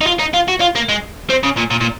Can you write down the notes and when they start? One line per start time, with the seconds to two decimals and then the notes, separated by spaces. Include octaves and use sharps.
0.01 D#4
0.06 F4
0.19 D#4
0.33 F4
0.48 F#4
0.60 F4
0.75 A#3
0.89 G#3
1.30 C4
1.43 C#3
1.57 A#2
1.71 A#2
1.81 A#2